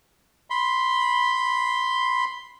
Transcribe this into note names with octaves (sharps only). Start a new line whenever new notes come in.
B5 C6